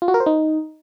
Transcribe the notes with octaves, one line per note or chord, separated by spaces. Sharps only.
F4
F#4
A#4
C5
D#4